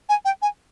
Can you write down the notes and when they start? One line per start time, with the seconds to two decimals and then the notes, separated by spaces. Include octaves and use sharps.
0.09 G#5
0.25 G5
0.42 G#5